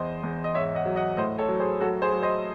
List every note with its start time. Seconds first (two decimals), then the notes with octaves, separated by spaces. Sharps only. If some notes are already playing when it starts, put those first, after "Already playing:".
Already playing: E2 C5 D#5
0.23 E2
0.44 D#5
0.54 G#2 C#5 E5
0.75 D#5 F#5
0.86 F#3
0.96 D#5 F#5
1.17 A2 C5 D#5
1.38 A4 C#5
1.49 F#3
1.60 G#4 C5
1.81 F#3 F#4 A4
2.02 G#4 C5
2.12 F#3
2.23 C5 D#5